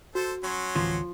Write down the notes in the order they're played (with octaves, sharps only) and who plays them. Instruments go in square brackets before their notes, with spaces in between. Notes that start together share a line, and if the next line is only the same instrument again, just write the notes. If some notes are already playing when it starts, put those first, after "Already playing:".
[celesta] F#4 [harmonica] A4 C5
[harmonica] F#3 C#4 C6
[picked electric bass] A1 D2 E3 [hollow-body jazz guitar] F3